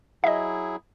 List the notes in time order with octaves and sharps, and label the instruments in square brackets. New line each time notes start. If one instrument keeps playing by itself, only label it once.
[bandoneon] F#3 E4 G#4 [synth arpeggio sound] D#5 E5